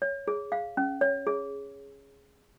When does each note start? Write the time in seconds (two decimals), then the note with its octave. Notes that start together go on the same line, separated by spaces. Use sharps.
0.02 C#5
0.28 G#4
0.52 F5
0.77 C#4
1.01 C#5
1.27 G#4